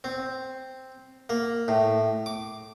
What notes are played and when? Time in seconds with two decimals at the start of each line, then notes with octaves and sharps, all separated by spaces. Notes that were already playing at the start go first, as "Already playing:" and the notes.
0.04 C4
1.30 A#3
1.68 A2
2.26 D6